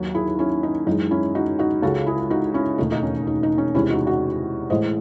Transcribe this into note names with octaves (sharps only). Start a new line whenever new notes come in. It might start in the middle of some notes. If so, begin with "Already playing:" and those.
Already playing: D#2 D#3 F#3
E4 G#4
C#4 E4
D#4
F#2 E3 G#3 D#4
C#4 E4
D#4 F#4
D#4 F#4
C#2 C#3 G#3 F#4 A4
E4 G#4
D#4 F#4
C#4 E4
E1 D#2 D#3 A3 D#4
D#4
C#4
D#4
D#4
C#4
E2 C3 D#3 G#3 C#4 E4
D#4 F#4
D#4 F#4
A1 A2 E3 G#3 C5 D#5